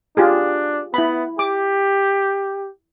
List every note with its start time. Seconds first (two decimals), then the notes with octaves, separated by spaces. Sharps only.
0.17 D4 F4 G4 G#4
0.94 B3 E4 B5
1.39 G4 D6